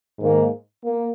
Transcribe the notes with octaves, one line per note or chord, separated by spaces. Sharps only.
G#2 D#3 A#3
A#3